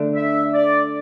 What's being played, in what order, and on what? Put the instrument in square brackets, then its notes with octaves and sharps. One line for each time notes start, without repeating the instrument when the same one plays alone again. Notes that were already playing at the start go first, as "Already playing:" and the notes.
Already playing: [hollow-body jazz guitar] D3 A3 D4
[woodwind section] E5
D5